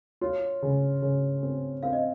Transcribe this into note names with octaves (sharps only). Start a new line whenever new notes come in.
F4 C#5
C#3
C#3 C#5
C4
C4 F5
D#5